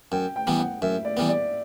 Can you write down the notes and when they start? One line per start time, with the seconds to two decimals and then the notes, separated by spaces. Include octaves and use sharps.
0.12 F#2 G5
0.36 G5
0.47 E3 G3 B3
0.59 F#5
0.82 F#2 E5
1.05 D5
1.17 E3 G3 B3
1.29 D5